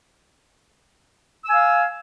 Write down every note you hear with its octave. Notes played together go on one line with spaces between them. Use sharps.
F5 G#5 E6